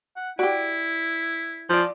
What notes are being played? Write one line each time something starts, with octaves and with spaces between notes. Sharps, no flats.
F#5
E4 F#4 G4 D5
F3 F4 D5